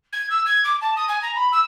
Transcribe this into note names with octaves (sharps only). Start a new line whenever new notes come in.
G#6
E6
G#6
D6
A5
D#6
G#5
A#5
B5
E6